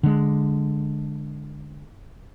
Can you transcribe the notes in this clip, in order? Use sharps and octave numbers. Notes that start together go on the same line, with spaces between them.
D3 G#3